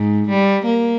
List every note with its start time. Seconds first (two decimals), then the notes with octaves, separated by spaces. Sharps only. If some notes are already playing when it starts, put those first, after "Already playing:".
Already playing: G#2
0.30 G3
0.65 A#3